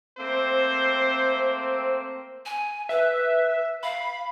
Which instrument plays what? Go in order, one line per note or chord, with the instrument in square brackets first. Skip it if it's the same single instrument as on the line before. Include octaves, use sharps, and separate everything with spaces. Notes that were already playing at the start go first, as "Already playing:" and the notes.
[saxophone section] A3 A#3 C4 [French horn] C5
[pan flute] G#5
[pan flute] B4 [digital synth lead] E5
[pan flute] F5 [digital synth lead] B5